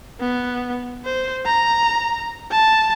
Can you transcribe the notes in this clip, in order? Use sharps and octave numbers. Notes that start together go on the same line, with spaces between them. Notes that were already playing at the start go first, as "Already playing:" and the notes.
B3
C5
A#5
A5